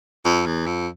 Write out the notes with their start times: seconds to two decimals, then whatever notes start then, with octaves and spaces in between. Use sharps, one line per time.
0.25 F2
0.46 E2
0.66 F2